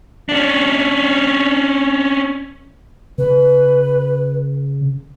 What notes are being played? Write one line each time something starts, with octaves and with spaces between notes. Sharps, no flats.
C#4 D4
C#3 B4